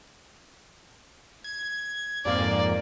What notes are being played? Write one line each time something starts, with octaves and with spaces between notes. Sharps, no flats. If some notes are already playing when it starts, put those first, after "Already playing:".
G#6
F2 G#2 A#3 D5